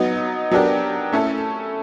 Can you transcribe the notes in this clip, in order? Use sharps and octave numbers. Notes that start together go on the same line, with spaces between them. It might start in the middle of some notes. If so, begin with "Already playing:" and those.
Already playing: F#3 B3 D#4
F#3 B3 D4 G4 A#4
A3 C#4 E4 A4